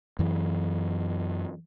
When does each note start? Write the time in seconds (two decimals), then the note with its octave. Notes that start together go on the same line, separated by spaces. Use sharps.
0.19 F#2 E3